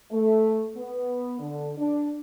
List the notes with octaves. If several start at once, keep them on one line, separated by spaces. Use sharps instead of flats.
A3
B3
D3
D4